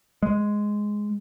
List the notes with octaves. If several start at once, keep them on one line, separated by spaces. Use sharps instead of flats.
G#3